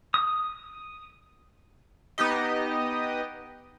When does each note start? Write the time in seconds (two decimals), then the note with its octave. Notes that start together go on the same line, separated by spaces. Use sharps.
0.14 D#6
2.18 B3 D#4 G4 D#5